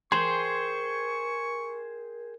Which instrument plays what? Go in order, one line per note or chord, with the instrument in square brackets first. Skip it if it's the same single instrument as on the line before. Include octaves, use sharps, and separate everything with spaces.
[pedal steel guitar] G#4 C5 G5 [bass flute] A#4 [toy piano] C6 [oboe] C#6